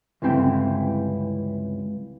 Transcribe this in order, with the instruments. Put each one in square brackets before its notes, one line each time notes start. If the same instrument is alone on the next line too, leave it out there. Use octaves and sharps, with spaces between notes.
[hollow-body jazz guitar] C#2 G2 D3 E3 C4 G5